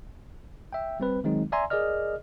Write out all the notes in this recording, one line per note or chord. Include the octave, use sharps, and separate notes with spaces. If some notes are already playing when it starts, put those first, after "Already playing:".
E5 G5
G3 C4 B4
D#3 F#3 G#3 C4 D#4
D5 E5 G#5 A#5 C6
G#4 A#4 D5 D#5 F6